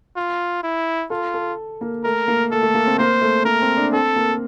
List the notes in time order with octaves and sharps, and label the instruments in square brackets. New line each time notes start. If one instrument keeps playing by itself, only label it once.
[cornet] F4
E4
[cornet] F4 [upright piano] A4
[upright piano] A4
A#3
[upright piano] A3 [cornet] A#4
[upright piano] A#3
[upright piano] A3 [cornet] A4
[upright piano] A3
A#3
C4
[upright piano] A#3 [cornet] C5
[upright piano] A3
[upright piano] A#3 [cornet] A#4
[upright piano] C4
D4
[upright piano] C4 [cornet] A4
[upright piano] A#3